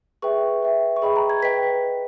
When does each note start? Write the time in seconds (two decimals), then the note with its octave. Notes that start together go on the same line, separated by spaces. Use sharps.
0.22 G#4 B4 E5 G5 C#6
0.62 B4 E5 G5
0.96 C#6
1.02 G#4 D#5 G5 B5
1.16 A#5
1.30 G#6
1.43 B4 D#5 G5 B6